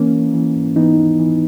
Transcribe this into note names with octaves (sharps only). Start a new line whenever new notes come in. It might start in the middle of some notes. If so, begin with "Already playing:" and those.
Already playing: E3 A#3 C#4
E3
E3
G#2
E3 B3 D#4
D#2
E3